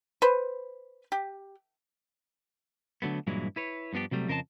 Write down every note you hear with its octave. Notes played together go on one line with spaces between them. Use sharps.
B4 C5
G4
D3 F#3 A3 B3
G2 A#2 E3 F#3 G#3 E4
E4 B4 C#5
G2 F3 B3 D4 G4
C3 F#3 G3 A3
F2 C#3 A#4 C5 D#5 A5